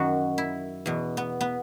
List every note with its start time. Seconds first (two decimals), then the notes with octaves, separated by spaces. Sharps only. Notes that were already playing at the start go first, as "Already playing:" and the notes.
Already playing: F#2 D#3 F#4
0.38 E4
0.86 E2 B2
1.17 B3
1.41 B3